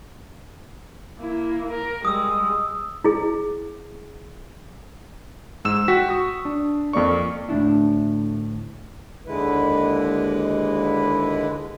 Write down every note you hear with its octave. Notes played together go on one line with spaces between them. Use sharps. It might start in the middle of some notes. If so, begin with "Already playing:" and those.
A#3 E4
A#4
G3 G#3 D#6 E6
E4 G#4
G#2 E6 E7
F#4 G5 B6
C#6 D#6
D4
F2 A#3 D5 C#6
D2 A2 D4 E4
D#2 D3 G#3 E4 B4